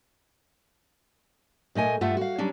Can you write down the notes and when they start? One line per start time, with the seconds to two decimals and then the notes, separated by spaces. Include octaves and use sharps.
1.75 A#2 A3 D#5 G#5
2.01 G2 A3 F4 E5 F#5
2.17 F#4 F5
2.38 F#3 G3 C#4 D4